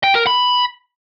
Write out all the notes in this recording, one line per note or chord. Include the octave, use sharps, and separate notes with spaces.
G5
A#4
B5